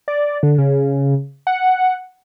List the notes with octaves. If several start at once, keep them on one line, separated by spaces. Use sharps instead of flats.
D5
D3
C#3
F#5